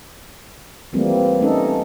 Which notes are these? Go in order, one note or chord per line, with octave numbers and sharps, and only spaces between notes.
E3 F3 G3 A3 A#3 C4
A3 C#4 D#4 A4